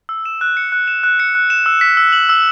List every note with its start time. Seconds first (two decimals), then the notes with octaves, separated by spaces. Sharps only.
0.09 E6
0.25 E7
0.41 F#6
0.57 C#7
0.72 F#6
0.88 E7
1.04 F#6
1.20 C#7
1.35 F#6
1.50 E7
1.66 E6
1.81 B6
1.97 E6
2.13 F#7
2.29 E6